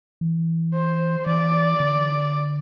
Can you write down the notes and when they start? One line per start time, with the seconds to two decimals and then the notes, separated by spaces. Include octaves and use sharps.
0.21 E3
0.74 C5
1.26 E3 D5
1.80 D3